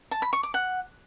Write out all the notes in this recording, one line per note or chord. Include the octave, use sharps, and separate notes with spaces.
A5
B5
C#6
D6
F#5